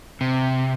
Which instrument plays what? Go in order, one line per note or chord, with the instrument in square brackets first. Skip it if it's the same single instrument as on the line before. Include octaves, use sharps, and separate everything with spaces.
[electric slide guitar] C3